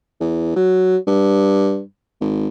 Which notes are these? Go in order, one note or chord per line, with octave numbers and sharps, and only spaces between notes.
E2
F#3
G2
G#1